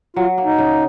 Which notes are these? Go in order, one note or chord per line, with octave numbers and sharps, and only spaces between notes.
F#3 F4
A#3
D#4
C#3